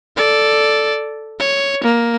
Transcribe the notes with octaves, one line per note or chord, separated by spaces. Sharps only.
A4 D5
C#5
A#3